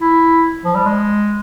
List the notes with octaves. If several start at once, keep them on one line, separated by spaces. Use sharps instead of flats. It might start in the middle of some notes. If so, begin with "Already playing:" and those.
E4
F3
G3
G#3